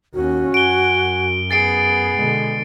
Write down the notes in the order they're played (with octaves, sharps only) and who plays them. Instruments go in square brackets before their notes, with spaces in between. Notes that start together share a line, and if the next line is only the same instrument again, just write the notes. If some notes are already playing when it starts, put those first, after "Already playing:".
[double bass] D#2 C#4 [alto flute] F#4
[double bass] F#2 [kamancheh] F#5 G#5 [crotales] D7 G7
[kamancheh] B3 G#4 [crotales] A6 C7 D7
[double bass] B2 D3 [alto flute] G#3